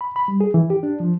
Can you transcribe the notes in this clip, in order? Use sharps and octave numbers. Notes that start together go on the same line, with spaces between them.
B5
B5
G3
G#4
E3
G4
D4
F3